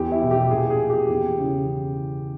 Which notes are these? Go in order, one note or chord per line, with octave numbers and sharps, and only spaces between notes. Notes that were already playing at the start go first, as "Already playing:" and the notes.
Already playing: E2 G4
E4
B2
G4
A#2 G#4
G#4
G4
E2
C#3 E3